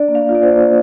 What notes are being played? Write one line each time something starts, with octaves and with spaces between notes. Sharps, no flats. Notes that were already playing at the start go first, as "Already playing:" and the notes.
Already playing: D4 D5
A#3
F5
F4
D5
C5
A#3